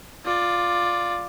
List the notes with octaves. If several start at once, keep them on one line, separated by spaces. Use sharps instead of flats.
F4 D5